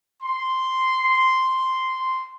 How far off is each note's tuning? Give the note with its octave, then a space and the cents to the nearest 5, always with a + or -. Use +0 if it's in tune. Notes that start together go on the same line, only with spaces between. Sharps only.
C6 -5